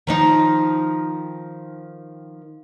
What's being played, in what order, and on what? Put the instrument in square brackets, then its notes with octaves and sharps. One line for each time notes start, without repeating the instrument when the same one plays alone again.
[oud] D#3 F3 D#4